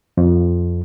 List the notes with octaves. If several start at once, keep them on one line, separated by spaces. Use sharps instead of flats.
F2